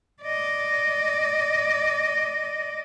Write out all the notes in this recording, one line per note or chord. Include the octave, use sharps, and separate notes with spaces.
D5 D#5